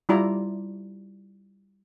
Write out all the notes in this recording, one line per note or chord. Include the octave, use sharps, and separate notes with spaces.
G3 E4 F4 D5 A#5